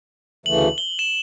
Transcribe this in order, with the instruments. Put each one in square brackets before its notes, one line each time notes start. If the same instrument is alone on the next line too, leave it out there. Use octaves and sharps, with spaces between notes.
[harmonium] D2 C#3 E3 A3 [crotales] F#7
[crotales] G7
E7